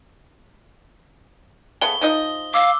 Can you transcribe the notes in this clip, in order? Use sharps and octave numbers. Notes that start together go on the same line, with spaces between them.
C#3 A3 B3 G7
F3 D#4 D#5
F5 D6 E6